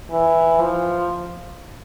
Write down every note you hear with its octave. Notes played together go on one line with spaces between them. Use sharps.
E3
F3